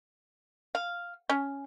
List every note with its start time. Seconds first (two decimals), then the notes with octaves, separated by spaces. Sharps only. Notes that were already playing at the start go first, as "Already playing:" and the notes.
0.75 F5
1.29 C#4